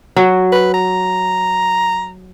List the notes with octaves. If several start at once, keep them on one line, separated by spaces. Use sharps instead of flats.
F#3
B4
A#5